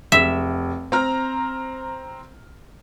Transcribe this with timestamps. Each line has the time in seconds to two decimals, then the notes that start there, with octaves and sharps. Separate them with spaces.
0.12 F1 E5
0.92 C4 A#5 F6